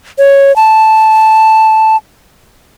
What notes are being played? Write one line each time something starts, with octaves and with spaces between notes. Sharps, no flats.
C#5
A5